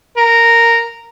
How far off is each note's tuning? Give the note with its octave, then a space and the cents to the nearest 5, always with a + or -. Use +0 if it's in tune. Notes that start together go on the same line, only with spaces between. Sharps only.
A#4 -10